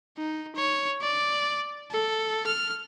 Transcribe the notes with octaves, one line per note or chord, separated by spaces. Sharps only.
D#4
C#5
D5
A4
F6